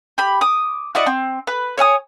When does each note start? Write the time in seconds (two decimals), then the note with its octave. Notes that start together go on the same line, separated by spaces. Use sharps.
0.18 G4 B5
0.41 D6 D#6
0.95 E4 F#4 D5 D#5
1.06 C4
1.47 B4
1.78 C#5 E5 G#5 D#6